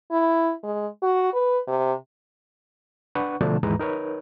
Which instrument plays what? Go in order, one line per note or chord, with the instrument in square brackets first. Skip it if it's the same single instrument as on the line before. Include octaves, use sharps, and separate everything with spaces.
[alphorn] E4
G#3
F#4
B4
C3
[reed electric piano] D4 B4 F#5 C#6
B2 D3 F3 A3 D4 A5
D#2 G#2 E3 G#3 B4 A#5
D#4 A#4 B4 C#5